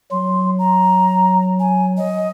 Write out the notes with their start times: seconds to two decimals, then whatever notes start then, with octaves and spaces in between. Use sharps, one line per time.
0.11 F#3 C6
0.59 A#5
1.59 G#5
1.97 D#5